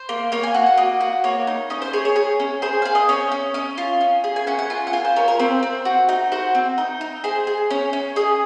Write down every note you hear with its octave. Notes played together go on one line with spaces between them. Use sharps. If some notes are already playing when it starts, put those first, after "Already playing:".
Already playing: C5
A#3
A#3 C#5
G#5
F#4
F#5
A#3 D#5
F#4
A#3 C#5
D#4
C#4 D#5
C5
G#4 C#5
C#5
G#4
C#4
G#4 C5
G#4 F5
D#5
C#4 C#5
C#4
C#4 D#5
F4
C#4
G#4
G#5
C#4 F#5
F#5
F4 G#5
F#5
F4 G#5
C5
C#4 A#4
A#4
C4 C5
C4
F#4
D#4
F#4 C5
C4
D#4
D#4
G#4 C5
G#4
C#4 C#5
C#4
G#4 D#5